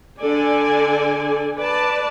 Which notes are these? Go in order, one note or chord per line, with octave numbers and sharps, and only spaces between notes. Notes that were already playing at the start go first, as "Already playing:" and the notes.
D3 A4 D5 G#5
B4 D5 A5